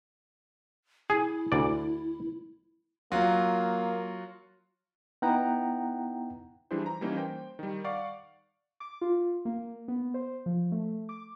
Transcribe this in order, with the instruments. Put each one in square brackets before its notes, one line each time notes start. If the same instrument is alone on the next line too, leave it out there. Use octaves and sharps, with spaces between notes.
[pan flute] E4 [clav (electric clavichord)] G#4
[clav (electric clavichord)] D2 D5
[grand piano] F#3 F4 F#4 [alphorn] A#3
[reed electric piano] B3 D#4 E4 F#5 G5 A#5
[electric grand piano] E3 G3 D4 E4 G#4 C5
A#5
E3 G3 A#3 C#4 D#4
C5 G5
D#3 G3
D5 F5 F#5 C#6 D6
[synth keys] D6
F4
A#3
B3
C5
F3
A3
D6